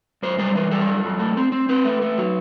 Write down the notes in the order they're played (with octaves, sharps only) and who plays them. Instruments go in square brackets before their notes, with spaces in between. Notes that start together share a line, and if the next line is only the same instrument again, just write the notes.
[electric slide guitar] F#2 C5
G3 C5
E3 B4
G3 A4
F#2
F#2
A3
C4
C4
C4 B4
A3
A3
F#3